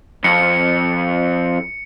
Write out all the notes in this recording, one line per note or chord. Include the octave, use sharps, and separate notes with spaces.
F2 C#7